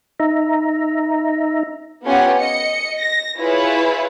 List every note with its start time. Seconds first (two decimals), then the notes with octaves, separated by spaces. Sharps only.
0.20 D#4 E5 A#5
2.05 B3 C#4 F4 G4 F#5 G#5
2.40 D#5 C#7
2.98 A#6
3.40 E4 F4 G#4 B4 C#5